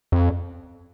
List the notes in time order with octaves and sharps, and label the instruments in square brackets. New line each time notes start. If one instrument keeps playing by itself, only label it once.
[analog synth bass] F2